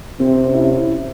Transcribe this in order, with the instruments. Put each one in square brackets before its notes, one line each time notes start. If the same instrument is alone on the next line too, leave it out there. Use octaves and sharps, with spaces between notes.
[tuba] C3 [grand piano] C4
[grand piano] C#4
E4
C#4
E4